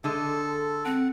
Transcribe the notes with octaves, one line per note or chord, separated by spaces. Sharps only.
D3 G#3 A4
C4 F#5